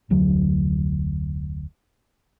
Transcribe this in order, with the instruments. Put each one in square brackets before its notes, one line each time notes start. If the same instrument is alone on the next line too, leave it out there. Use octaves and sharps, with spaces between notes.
[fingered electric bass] F1 D2 F#3